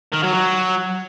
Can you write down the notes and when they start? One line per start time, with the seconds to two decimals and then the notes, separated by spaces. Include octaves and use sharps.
0.13 D#3
0.23 F#3
0.33 F#3